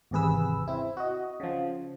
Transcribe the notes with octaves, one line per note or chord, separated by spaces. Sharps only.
G#1 E2 C3 G#4 B4 E6
C4 E4
F#4 D#5
C#3 F3